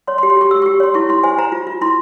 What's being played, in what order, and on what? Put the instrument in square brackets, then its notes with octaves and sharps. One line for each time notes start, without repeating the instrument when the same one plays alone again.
[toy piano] C#5 C6
C6
G4
C6
G4 C#6
G4 E6
C#6
G4
C#5 C6
E4 C#6
E4 C6
C5 G#5
C5 A#5
F4
F4
E4 C6